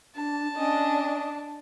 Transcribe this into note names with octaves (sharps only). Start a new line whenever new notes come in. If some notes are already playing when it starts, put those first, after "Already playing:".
D4 A5
C#4 D4 D#5